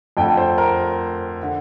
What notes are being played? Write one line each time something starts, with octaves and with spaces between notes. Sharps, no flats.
F2 D3 A3 G5
C5
A#4
D3